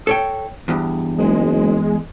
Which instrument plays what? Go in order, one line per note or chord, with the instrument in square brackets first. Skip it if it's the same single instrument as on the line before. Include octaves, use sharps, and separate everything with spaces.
[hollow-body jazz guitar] A4 C#5 G5
E2 G2
[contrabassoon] F#1 [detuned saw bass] G#3